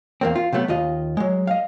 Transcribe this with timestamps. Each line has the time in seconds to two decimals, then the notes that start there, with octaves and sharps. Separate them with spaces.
0.21 E2 A#3 C4
0.36 F4
0.53 C3 F#3 A3 B3
0.68 D#2 F4 D#5
1.17 F#3 G#3
1.47 D#5 F5